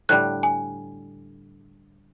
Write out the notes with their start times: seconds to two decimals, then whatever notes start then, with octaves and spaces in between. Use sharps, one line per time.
0.09 A2 D3 G3 F#6
0.43 G#5